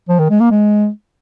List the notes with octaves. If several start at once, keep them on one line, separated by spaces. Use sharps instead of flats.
F3
D#3
G#3
A#3
G#3